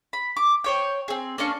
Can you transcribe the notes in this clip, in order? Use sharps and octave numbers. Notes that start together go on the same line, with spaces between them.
B5
D6
C5 C#5 G5
C4 G#4
A#3 C#4 D4 C#6